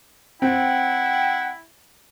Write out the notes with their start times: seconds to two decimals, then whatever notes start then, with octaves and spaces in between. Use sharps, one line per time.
0.42 C4 E4 F#5 G5